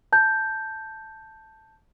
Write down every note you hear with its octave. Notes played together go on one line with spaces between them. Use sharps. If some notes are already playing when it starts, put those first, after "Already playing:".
A5 G6